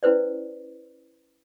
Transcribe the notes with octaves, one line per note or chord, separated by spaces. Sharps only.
C#4 E4 B4 C5 D5